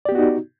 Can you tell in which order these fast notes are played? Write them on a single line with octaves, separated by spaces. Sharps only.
D5 G4 B3 F#4 D#4